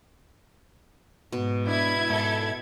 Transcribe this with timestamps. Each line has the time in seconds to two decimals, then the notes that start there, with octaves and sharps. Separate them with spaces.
1.32 G#2 B2
1.67 B3 D4 E4 G#6
2.10 G#2 A4 D5